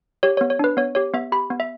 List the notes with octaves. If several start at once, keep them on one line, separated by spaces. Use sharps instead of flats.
G4 C#5
B3 C#5
C#5
D4 B4
B3 C#5
G4 C#5
B3 E5
G4 B5
B3
E5